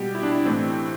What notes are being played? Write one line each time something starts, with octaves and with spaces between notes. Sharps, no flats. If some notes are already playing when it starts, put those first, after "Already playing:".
Already playing: B2 G3 G4
E4
D4
E4
A2 E3 A3 C4